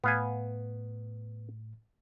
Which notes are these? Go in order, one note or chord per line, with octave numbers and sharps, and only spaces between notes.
A2 B3 F5 G#5